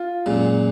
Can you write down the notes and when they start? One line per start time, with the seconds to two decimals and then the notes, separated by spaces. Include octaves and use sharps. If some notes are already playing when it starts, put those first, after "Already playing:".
Already playing: F4
0.26 F#2 A#2 G#3